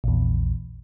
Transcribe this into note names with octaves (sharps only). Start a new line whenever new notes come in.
A#1 E2